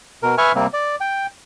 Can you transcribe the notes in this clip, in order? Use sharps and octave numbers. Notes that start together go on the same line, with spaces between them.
B2 A#4
B4 E5 G#5 C#6 F6
C3 G3 A#3 C4
D5
G5